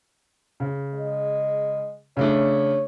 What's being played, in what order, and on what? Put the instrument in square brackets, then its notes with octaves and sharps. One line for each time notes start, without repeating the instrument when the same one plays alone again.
[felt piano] C#3
[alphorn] G#3
[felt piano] C#3 A3 D4 [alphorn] C#5